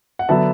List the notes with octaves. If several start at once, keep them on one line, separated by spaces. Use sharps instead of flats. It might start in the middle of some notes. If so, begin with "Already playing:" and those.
F#5
D3 F#3 B3 E5 A5